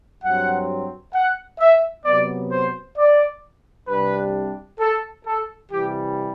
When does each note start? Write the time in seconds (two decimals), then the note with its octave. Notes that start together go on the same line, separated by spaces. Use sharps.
0.23 G2 F#3 C4 F#5
1.14 F#5
1.59 E5
2.05 C3 F#3 B3 D5
2.51 C5
2.96 D5
3.88 C2 C3 G3 D4 B4
4.79 A4
5.25 A4
5.70 C3 E3 G3 G4